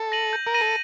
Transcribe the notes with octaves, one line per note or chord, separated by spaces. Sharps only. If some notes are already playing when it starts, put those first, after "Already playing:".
Already playing: A4
A#6 D#7 F#7
G6
A#4
A#6 D#7 F#7
A4